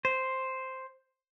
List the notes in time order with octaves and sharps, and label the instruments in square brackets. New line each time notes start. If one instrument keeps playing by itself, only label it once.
[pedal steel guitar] C5